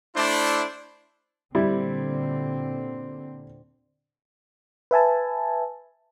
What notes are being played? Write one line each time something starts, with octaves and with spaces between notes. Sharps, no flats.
A3 D4 E4 C5 D5
A#2 D3 G3 C4 E4
B4 E5 G#5 A5